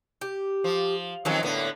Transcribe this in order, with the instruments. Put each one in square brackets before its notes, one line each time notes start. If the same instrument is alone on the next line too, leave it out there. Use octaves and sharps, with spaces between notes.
[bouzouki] G4
[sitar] F3
[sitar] D#3 F3 F#3 [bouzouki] C4 C#4 A4
[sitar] A2 D3 B3 [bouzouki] A#3